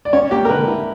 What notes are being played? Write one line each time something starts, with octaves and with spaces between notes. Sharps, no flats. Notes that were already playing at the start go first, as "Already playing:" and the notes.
D5
C#4 C#5
A#3 G4
A#4
D3 B4
E4